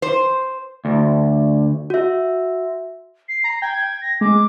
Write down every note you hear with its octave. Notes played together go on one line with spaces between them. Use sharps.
C5
D2
F#4 E5
C7
A#5
G5 G#6
A#6
G#3 D6